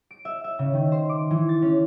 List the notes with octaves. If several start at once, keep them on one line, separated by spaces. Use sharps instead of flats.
D7
E5
E5
C#3
D#3
C5
D6
E3
A6
C#4